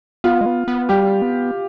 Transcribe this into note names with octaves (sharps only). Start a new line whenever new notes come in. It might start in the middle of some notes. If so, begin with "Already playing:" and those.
B3 F4
G#3
B3
B3
G3 G4
B3